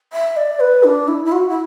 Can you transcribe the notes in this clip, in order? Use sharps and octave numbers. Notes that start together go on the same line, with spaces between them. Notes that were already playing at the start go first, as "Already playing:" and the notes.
E5
D5
B4
D4
E4
E4
F#4
E4